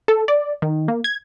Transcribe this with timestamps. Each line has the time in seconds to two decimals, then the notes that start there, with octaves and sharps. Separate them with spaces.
0.08 A4
0.28 D5
0.62 D#3
0.88 A#3
1.04 G#6